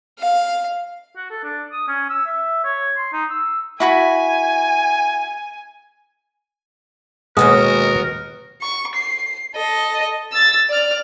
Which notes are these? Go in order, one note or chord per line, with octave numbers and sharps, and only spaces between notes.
F5
F#4
A4
D4
D#6
C#4
E6
E5
C#5
C6
D#4
E6
E4 F#4 G#5 B5
D#2 B2 G#3 B3 F#4 A#4 D#6
C#6
C7
A4 D#5
E6 A6
D5 F6